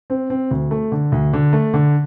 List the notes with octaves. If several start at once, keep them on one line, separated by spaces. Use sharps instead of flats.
C4
C4
D2
A3
D3
D2
D3
A3
D3